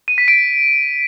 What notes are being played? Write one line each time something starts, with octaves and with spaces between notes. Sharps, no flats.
D#7
B6
D7